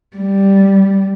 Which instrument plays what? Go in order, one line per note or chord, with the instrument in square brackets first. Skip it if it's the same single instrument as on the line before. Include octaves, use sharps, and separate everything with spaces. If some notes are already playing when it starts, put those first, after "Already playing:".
[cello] G3